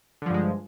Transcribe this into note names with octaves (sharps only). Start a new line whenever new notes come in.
G2 D3 F3 G#3